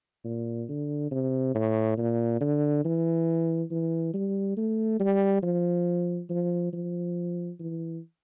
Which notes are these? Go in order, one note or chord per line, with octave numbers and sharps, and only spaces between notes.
A#2
D3
C3
A2
A#2
D3
E3
E3
G3
A3
G3
F3
F3
F3
E3